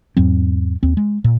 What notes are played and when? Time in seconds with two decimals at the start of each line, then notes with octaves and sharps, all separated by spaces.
0.17 E2 G#2 F#3 C4
0.83 D#2 C4
0.97 G#3
1.24 A#2